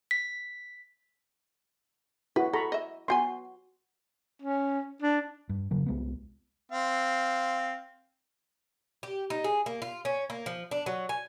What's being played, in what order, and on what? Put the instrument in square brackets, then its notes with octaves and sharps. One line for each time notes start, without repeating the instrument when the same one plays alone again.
[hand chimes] B6
[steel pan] E4 F#4 [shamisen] B4
[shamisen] A4 [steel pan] A#5 B5 C#6
[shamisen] D#5 E5
[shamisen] B3 G5 G#5 [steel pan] F#4 C6
[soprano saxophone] C#4
D4
[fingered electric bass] G2
F1 C#3 F#3
C2 G#3 B3
[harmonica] C4 F5
[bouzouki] G4
D#4
G#4
A#3
F4
C#4
A#3
F3
D4
F#3
G#5